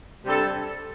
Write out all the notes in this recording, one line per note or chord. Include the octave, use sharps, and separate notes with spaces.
C3 G3 D4 A4